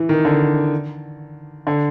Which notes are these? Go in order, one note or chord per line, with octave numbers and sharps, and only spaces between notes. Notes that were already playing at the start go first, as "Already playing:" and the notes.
Already playing: E3
D#3
D3
D3